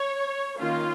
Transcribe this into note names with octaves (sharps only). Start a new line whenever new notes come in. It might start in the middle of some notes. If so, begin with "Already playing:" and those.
Already playing: C#5
D#3 A#3 C#4 F4